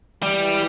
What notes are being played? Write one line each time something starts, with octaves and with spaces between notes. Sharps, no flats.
E3 G3